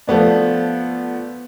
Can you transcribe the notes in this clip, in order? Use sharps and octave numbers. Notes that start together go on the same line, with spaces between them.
F3 A3 B3 D4